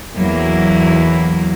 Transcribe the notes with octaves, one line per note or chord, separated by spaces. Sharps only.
E2 F#3 A#3 E4